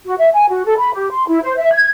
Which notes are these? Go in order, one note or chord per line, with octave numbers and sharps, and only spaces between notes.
F#4
E5
G#5
F#4
A4
B5
G4
C6
E4
C5
E5
G#6